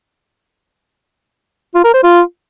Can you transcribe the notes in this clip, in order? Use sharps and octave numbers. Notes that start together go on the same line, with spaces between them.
F4
A#4
C5
F4